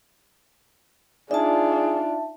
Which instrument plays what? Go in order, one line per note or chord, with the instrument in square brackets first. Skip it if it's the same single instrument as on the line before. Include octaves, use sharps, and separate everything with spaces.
[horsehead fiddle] D4 F4 [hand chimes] D#4 D5 [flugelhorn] G#4 [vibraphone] E5 A5